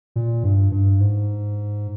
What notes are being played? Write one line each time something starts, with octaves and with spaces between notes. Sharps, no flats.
A#2
G2
G2
G#2